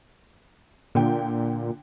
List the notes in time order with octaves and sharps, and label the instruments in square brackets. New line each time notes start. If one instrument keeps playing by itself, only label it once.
[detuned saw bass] A#2 [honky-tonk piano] D3 G5